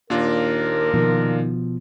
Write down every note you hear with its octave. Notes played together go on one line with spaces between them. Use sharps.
D#2 A#2 D4 F4 A#4
B2 D#3 F3